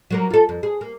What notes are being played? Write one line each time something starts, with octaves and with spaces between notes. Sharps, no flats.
F#3 A#3 A#4
F4 A4
F2
G#4
A#3